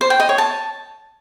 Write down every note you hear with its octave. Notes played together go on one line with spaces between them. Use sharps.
C5
G5
D#5
C#5
A5